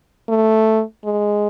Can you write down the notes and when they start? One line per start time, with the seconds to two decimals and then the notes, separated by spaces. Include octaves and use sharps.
0.29 A3
1.04 G#3